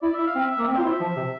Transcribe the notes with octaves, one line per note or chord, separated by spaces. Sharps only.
E4 D5
E4 E5
F5
C4
E5
E5
A#3
C4 E5
F4 C5
E4
E5
F3
C3